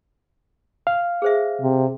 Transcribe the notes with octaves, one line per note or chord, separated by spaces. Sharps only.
F5
G#4 C5 E5
C3